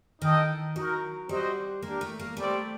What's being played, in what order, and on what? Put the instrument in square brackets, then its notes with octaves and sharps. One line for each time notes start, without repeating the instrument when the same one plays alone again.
[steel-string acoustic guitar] D#3 [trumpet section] D#4 A4 D#5 G5
[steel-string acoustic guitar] F#3 [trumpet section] D#4 F#4 A#4
[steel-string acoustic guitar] G3 [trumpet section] C4 F#4 C5 D#5
[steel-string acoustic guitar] A#3 [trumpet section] D4 G4 A#4
[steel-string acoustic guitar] A3
A#3
[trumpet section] G3 C4 G4 D5 [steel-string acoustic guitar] A3